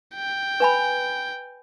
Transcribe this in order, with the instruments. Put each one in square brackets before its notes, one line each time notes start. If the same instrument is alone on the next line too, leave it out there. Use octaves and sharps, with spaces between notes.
[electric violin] G5
[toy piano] B4 G#5 B5